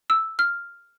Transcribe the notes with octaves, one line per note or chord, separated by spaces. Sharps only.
E6
F6